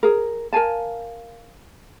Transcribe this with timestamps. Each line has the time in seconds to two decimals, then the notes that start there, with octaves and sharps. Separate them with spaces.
0.03 G#4 A#4
0.53 A#4 F5 G#5 A5